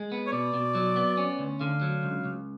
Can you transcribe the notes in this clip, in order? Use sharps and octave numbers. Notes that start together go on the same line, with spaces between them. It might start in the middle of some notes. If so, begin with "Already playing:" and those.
Already playing: G#3
B3
C#5
B2 D5
B2
F#3
B3
C#4
D2
D3 F5
F#3
C#2
C#2